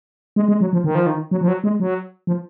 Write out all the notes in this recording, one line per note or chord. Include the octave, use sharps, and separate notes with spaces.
G#3
G#3
F#3
F3
D#3
F3
D#3
F#3
F3
F#3
G#3
F#3
F3